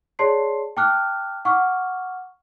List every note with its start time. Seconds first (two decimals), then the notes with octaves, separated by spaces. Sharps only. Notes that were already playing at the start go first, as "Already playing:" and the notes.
0.19 G#4 C#5 D5 A5 C6 C7
0.77 G5 A5 D6 F6 F#6
1.45 F#5 C#6 D6 F6